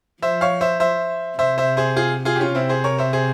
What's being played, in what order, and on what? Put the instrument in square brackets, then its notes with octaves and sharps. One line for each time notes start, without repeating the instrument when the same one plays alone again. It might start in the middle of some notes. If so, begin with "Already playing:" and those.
[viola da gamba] F3 [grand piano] C5 E5
[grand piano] C#5 F5
C5 E5
C5 E5
[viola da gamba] C3 [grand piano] C5 E5
[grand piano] C5 E5
G#4 C5
F4 G#4
F4 G#4
G4
C#4 F4
[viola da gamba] C3 [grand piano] C4 E4
[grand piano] G#4 C5
A#4 C#5
C5 E5
G#4 C5